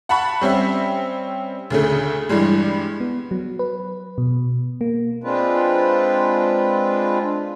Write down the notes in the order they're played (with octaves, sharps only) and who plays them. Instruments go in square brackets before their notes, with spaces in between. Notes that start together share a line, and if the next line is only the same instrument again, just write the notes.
[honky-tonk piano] F#5 A5 B5 C#6
G3 C4 C#4 E5
D2 C#3 A3
G2 E3 G3 G#3
[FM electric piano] B3
F#3
B4
B2
A#3
[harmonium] G#3 C4 D4 F4 B4